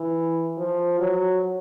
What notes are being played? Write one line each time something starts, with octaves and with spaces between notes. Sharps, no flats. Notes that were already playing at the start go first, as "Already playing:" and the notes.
Already playing: E3
F3
F#3